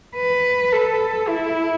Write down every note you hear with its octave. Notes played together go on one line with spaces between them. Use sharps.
B4
A4
E4